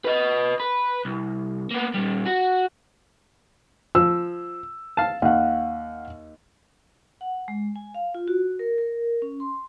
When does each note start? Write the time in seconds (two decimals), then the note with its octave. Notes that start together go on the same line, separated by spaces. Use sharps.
0.05 B4 D#5
0.60 B4
1.05 C2
1.71 A#3 B3
1.95 A#2 G3
2.26 F#4
3.95 F3 E6
4.97 F5 A5
5.22 D#2 F5 F#5
7.21 F#5
7.48 G#3
7.76 G#5
7.94 F5
8.14 F4
8.28 F#4
8.59 A#4
8.78 A#4
9.22 C#4
9.40 C6